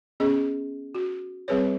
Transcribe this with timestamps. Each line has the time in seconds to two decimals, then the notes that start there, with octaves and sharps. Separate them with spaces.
0.20 B3 C#4 G#4 D#5
0.95 F#4
1.48 G3 C4 G#4 B4 C#5